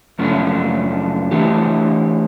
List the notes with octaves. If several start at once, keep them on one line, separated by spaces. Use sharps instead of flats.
F#2 C#3 F3 A3 D4
E3 A3 D4 G4